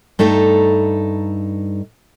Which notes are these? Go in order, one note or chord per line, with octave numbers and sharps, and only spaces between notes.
G2 A3 D#4 A4 A#5